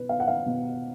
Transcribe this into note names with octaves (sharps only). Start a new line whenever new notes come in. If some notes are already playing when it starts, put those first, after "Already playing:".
Already playing: B2 B4
B3 F5
F#5
F5
B2